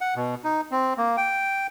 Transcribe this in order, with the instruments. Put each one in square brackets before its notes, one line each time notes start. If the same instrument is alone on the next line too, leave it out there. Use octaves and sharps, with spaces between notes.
[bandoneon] F#5
B2
D#4
C4
A#3
G5